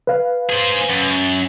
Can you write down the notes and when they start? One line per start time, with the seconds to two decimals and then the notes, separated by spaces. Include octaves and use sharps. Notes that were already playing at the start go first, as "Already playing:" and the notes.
0.07 B4 F5
0.50 G#4 C5
0.89 F#2